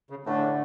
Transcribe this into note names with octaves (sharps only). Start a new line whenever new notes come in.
C#3
A2 D3 E3 A3 D4